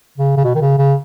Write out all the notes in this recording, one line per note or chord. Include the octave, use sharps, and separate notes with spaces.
C#3
C#3
B2
D#3
C#3
C#3